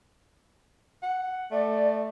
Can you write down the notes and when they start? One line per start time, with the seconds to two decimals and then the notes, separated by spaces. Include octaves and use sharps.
1.03 F#5
1.51 A3 D5